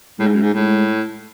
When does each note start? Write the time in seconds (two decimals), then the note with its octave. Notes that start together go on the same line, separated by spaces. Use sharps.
0.19 A2 G#3
0.27 G#2
0.34 F#2
0.42 G#2
0.54 A2 G#3